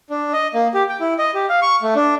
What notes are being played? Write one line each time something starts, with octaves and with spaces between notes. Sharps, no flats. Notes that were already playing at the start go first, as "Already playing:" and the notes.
D4
D#5
A#3
G4
G5
E4
D#5
G4
F5
C#6
A3
D4